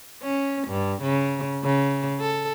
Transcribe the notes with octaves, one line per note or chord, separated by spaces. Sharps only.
C#4
G2
C#3
C#3
A4